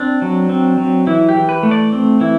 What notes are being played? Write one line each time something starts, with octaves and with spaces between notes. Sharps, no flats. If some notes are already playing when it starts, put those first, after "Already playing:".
Already playing: C4 D4
F#3
C4
F#3
E3 E4
G4
E3
B4
A3
D5
C4
E3 E4